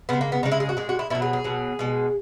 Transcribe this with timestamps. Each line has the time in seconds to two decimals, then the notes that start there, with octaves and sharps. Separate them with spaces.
0.09 C#3 G#3 B3
0.21 A#3
0.32 B3
0.43 C#3 E3 G#3 D#4
0.52 E4
0.60 G#4
0.69 F#4
0.77 A#2 G#3 G#4
0.89 F#4
0.99 E4
1.10 B2 F#3 E4
1.22 G#4
1.33 G#4
1.44 B2 F#3
1.79 B2 G#3